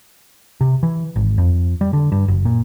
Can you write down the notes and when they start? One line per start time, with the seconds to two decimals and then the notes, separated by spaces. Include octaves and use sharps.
0.61 C3
0.83 E3
1.16 G#1
1.38 F2
1.81 G3
1.93 D3
2.12 G2
2.28 F#1
2.45 A#2